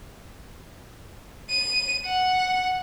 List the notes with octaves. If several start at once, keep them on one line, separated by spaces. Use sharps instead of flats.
D#7
F#5